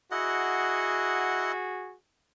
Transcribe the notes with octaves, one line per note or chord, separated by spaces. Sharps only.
E4 F#4 G#4 D#5 F#5